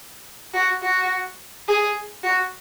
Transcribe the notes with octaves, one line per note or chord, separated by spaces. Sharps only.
F#4
F#4
G#4
F#4